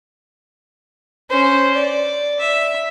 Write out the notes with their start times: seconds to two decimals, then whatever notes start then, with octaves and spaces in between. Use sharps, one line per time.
1.30 C#4 C5
1.75 D5
2.40 E5